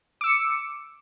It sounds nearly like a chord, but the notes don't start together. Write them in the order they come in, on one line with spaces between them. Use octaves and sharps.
D6 E6 C#7